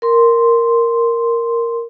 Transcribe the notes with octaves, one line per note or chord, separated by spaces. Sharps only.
A#4 C6